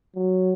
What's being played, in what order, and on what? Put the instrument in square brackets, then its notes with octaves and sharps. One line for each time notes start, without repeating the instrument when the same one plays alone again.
[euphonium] F#3